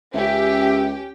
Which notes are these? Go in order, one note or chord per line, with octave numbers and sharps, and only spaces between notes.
C#2 C#4 G4 E5 G5